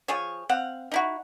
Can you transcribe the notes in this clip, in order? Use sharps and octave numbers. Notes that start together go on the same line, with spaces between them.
F3 G#4 C#5
C4 F5 F#5
D#4 E4 F#4